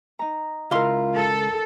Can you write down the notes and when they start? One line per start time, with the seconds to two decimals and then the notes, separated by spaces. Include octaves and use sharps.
0.19 D#4 A#5
0.71 C#2 E4 F4 A#4 F5 C6
1.16 A4